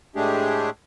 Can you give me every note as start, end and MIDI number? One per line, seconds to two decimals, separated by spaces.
0.16 0.70 45
0.16 0.70 56
0.16 0.70 57
0.16 0.70 62
0.16 0.70 67
0.16 0.70 68